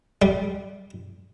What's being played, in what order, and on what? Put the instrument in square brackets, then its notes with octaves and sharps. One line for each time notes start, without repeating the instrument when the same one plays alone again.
[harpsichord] G3